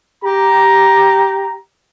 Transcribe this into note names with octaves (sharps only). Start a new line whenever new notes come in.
G4 A#5